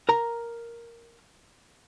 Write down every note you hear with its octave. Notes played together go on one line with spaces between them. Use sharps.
A#4 A#5